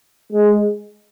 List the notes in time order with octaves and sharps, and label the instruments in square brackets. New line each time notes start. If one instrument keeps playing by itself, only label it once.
[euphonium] G#3